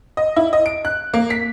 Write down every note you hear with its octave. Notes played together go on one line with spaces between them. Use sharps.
D#5
E4
D#5
D7
F#6
A#3
B6